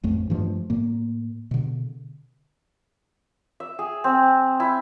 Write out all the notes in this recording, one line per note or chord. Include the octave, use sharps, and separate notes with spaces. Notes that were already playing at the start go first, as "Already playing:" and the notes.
A1 F2 A3
G2 E3 F3 A3
A2 A#3
B2 D3
E5
G#4
C4
E4